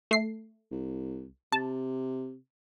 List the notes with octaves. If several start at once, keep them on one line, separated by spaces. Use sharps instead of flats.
A3 C7
C2
C3 A5